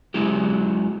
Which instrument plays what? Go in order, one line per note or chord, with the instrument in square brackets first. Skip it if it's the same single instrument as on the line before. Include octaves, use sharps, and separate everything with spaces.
[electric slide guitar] F#3 G#3 E4 G4